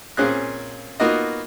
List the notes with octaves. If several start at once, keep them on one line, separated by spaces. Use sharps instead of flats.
A#2 C4 C#4 G#4 F#6
A#3 B3 D#4 F4 F#4 D#5